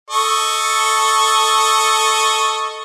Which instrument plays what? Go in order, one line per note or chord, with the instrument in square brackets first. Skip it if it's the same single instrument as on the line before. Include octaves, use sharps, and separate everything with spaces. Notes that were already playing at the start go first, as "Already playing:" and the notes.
[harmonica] A4 D#5 C#6